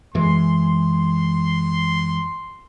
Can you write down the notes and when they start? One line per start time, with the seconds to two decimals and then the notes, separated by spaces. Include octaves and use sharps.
0.14 F#2 E3 G#3 C6